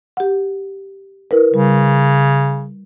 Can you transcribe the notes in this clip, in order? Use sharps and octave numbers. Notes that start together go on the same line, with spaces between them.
G4 F#5
E4 A#4 B4
C#3 G3